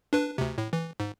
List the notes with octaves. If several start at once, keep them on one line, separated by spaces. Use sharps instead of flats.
D4 B4
D2 C3
A2
E3
G#2